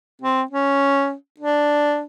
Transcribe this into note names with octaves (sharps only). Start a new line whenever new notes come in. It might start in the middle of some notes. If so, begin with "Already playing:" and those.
C4
C#4
D4